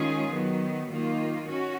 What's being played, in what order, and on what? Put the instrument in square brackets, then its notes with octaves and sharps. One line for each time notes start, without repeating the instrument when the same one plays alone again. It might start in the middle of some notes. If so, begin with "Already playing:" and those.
Already playing: [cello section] D#3 G#3 C#4 F4 G#4
D#3 F#3 B3
D#3 A#3 F4
C#4 F#4